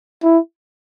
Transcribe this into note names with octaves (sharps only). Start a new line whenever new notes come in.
E4